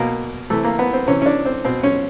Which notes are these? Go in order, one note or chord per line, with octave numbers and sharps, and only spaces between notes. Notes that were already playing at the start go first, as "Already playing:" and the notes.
Already playing: B2 A#3
C3 E3 A3
A#3
B3
C4
C3 E3 C#4
C#4
D4
C4
B2 C4
C#4